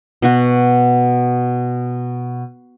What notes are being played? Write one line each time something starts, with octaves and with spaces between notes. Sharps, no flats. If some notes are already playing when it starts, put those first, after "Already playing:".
B2 F#4